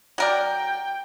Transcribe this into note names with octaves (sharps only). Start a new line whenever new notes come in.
F#3 A#4 D5 G5